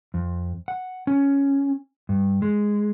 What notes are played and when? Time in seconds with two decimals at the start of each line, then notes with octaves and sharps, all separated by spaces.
0.14 F2
0.68 F#5
1.07 C#4
2.09 G2
2.42 G#3